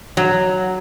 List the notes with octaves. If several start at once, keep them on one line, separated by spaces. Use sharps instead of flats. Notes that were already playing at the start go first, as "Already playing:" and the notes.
F#3